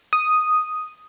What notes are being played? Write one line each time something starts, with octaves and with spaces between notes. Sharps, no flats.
D#6